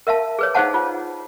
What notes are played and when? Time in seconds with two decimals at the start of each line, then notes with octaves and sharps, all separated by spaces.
0.07 A#4 E5 F5 A5
0.39 G#4 B4 C#5
0.54 D#4 G#4 C5 F5 F#5 A5
0.74 F4